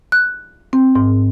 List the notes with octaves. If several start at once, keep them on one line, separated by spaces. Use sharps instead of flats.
F#6
C4
G#2